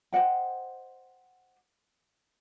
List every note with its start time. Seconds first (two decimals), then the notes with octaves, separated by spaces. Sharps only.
0.13 C5 D#5 F#5 G5